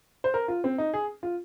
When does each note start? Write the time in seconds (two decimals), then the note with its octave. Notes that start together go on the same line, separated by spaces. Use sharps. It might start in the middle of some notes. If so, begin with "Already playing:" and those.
0.24 C5
0.34 A#4
0.48 F4
0.64 C4
0.78 D#4
0.94 G#4
1.23 F4